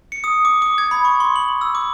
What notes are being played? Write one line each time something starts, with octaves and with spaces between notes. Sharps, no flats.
C#7
D#6
D6
D6
G#6
B5
C#6
C6
F#7
E6
D6